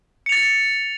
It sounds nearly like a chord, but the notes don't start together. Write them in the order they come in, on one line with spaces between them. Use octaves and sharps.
C#7 F7 A6